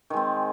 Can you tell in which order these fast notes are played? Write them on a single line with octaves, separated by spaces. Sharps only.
D#3 G#3 C4